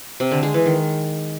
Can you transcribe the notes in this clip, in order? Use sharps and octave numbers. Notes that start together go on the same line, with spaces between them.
C3
D3
G#3
E3
D#3